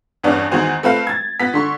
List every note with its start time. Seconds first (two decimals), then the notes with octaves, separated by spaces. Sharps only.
0.23 E2 G2 B3 C#4 D4
0.52 E2 D#3 F#4 C5 G#5
0.83 A3 C4 B4 F5
1.07 G#6 A6
1.40 B3 B6
1.54 D3 C6 C#6